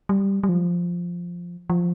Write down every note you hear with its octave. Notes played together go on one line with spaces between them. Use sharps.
G3
G3
F3
F3